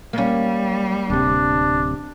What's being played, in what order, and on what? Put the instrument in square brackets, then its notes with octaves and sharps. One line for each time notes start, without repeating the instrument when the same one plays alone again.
[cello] G3 [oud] A#3 C#4
[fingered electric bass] D1 C3 [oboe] D4